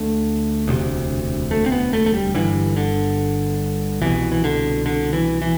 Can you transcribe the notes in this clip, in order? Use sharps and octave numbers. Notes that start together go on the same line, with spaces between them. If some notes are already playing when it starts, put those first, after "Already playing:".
Already playing: D2 D3 A3
E1 D2 C3
A3
C4
B3
A3
A3
G3
G1 G2 D3 E3
D3
C2 B2 E3
E3
D3
D3
E3
E3